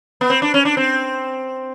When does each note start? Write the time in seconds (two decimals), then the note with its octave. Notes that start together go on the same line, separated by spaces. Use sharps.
0.21 B3
0.30 C4
0.42 D4
0.54 C#4
0.65 D4
0.77 C4